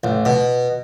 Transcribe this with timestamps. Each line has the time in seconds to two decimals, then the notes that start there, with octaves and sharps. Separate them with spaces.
0.04 A1
0.25 B2